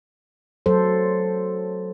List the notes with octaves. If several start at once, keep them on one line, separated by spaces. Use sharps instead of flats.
F#3 A4 C5